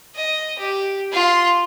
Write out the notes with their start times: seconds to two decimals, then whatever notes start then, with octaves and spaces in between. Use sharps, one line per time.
0.16 D#5
0.59 G4
1.13 F4 C6